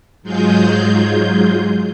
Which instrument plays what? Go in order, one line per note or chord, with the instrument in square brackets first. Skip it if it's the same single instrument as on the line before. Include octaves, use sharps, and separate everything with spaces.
[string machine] G#2 F#3 G#3 F4 G#4 G6